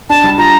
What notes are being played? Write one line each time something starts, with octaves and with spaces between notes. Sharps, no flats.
D4 A5
G3
F4 A#5